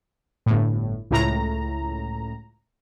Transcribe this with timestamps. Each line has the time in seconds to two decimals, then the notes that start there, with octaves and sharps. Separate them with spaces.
0.46 G1 A2
1.11 C#2 A2 A#5